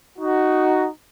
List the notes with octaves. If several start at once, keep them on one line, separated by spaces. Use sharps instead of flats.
D#4 F#4